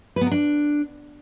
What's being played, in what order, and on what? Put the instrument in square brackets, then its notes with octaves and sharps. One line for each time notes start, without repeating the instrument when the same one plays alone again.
[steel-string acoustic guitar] B4
B3
A#4
D4